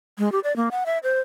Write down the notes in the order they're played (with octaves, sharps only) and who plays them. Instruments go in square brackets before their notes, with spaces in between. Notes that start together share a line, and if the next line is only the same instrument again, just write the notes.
[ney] G#3
G4
D5
A#3
F#5
E5
C5